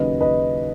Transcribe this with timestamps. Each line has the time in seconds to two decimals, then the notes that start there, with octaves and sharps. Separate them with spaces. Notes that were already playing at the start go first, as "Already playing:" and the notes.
Already playing: D#2 C#3 F#3 B4 D#5
0.21 B4 D#5